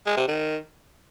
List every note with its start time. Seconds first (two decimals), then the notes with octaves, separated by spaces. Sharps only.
0.06 G#3
0.17 C3
0.28 D#3